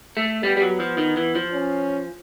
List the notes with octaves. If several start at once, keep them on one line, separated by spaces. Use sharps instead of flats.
A3
G3 B3
G3
F#3
F3
D#3
E3
F3
C#4